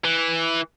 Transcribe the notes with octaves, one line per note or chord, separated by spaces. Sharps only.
E3